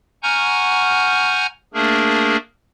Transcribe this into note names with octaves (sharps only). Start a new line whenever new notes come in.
F#5 G#5 A#5 C#6 F6 G6
A3 A#3 D4 G#4 A#4